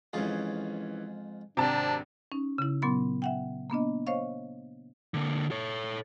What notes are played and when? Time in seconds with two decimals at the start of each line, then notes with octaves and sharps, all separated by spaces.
0.13 F2 G#2 E3 C#4 F4 G#4
1.57 G#1 C3 D4 G5 A5 A#5
2.32 C#4 D#4
2.58 C#3 E4
2.82 A#2 F#3 B3 C6
3.22 E5 F#5 G5
3.70 A#3 B3 D4 D#5
4.07 C5 C#5 D#5 F5 C#6
5.14 D3 A#3
5.51 A4 C#5